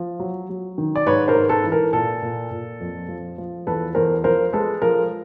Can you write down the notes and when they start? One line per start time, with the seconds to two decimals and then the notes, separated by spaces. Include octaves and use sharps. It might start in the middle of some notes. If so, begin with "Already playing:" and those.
Already playing: F3
0.20 F#3
0.49 F#3
0.78 D#3
0.96 D5
1.06 G#2 B4 C#5
1.28 A#4 C5
1.35 G#2
1.49 A4 B4
1.64 E3
1.72 A#4
1.93 A#2 A4
2.22 A#2
2.51 A#2
2.80 F2
3.08 F3
3.38 F3
3.67 E2 A4 B4
3.95 E2 A#4 C5
4.24 F3 A#4 C5
4.53 G#3 A4 B4
4.82 F3 A#4